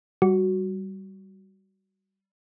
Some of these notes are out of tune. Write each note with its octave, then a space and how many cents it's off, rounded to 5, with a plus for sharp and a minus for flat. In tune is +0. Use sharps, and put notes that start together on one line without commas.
G3 -15 F#4 +5